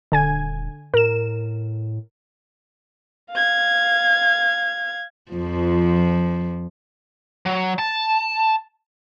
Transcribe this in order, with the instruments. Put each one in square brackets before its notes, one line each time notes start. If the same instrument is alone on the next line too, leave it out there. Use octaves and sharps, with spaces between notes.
[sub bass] D#1 [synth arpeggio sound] D3 G#5 G#6
[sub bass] A2 [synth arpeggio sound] A#4 E7
[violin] F5 G#6
[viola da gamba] F2 F3
[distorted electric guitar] F#3
A5